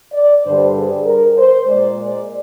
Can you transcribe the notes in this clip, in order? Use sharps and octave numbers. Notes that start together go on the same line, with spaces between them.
D5
G2 D3 G3 C5
G#4
A#4
C5
A#2 G#3 D5
D5